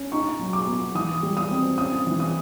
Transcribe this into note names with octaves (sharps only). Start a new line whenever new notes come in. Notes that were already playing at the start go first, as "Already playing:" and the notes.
Already playing: C#4
D#4 C#6
F#3
D6
B3
E3 D#6
G3
D#6
C4
C#4 D#6
E3
D#6